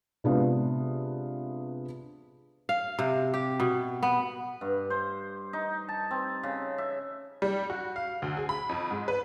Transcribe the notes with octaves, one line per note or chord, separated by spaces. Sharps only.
C3 G#3 B3 D4 F4
F5
C3
G4
B2
B3
G2
C5
D#4
A5
C4
C#3
E5
G3
F#4
F5
D2
G#4
B5
F2
G#2
B4